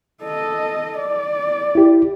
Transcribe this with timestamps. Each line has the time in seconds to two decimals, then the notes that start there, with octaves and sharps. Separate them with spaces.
0.23 A4 D#5
0.98 D5
1.75 E4 G4